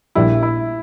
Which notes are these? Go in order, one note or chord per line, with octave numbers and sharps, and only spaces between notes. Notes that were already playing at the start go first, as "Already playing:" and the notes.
A#1 A#2 G3 E4
E4